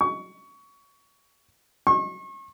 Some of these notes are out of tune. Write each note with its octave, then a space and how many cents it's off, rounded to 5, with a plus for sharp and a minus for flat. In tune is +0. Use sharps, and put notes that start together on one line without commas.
C#6 +20
C#6 -40